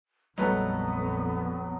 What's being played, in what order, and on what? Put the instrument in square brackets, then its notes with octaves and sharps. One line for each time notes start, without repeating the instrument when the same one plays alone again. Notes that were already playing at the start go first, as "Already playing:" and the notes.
[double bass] A#1 F2 [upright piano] F#3 G3 A4 [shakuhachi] B3 [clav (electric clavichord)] D#4 B4